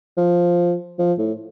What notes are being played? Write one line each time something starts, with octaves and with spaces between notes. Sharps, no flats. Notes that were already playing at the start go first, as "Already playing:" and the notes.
F3
F3
A2